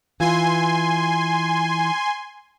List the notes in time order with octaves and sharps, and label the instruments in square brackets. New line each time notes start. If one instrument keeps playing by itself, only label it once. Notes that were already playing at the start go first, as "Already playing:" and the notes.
[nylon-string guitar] E3 F4 [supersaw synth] G#5 C6